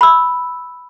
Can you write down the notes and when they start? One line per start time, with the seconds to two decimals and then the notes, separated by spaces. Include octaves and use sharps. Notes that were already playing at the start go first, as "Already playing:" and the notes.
0.01 B5 E6